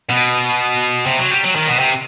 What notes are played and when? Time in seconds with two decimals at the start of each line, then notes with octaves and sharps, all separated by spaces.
0.10 B2
1.06 C3
1.19 F#3
1.30 G3
1.44 F#3
1.56 D#3
1.68 B2
1.79 C3